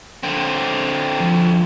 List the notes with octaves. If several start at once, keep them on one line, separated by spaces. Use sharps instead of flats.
D3 C4
F3